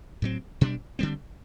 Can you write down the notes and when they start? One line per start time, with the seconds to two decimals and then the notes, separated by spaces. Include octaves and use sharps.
0.22 A2 F#3 C4
0.61 B2 G3 D4
0.99 D3 G3 C4